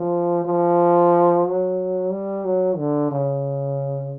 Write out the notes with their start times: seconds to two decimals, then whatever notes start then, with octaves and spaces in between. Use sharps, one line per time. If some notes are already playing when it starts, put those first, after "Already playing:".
Already playing: F3
0.45 F3
1.45 F#3
2.11 G3
2.45 F#3
2.78 D3
3.11 C#3